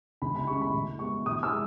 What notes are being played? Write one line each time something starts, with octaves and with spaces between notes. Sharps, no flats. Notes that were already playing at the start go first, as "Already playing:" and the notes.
C#2 B5
B5
C#3 G#3 C#6
B5
A2
G#3 B3 C#6
A2 D#6
E6
G#3